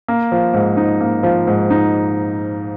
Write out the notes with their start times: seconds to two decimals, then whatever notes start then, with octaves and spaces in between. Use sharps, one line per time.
0.08 A#3
0.32 F3
0.54 G#2
0.77 D#4
1.01 A#3
1.23 F3
1.47 G#2
1.70 D#4